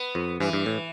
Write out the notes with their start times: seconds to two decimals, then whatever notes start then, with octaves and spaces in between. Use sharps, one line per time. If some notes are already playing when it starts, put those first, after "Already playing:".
Already playing: B3
0.15 F2
0.40 G2 E3
0.53 G2
0.66 A2